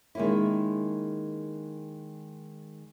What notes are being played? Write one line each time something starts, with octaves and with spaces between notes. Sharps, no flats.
D#3 G#3 A#3 C#4 E4